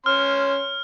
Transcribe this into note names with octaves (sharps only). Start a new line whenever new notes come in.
C#4 C6 F6